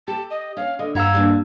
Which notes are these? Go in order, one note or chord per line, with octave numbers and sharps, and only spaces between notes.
G4 A5
D#5
C#4 F5
D3 D#5
G2 E4 F5 F#5 A#5 E6 G#6
G3 A#3 D4